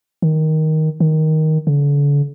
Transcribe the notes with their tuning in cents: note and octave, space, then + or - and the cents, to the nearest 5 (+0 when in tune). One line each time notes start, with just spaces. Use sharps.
D#3 +10
D#3 +10
D3 -40